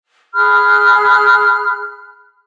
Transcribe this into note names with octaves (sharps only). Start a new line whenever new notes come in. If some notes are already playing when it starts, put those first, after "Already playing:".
G#4 B5 F6 F#6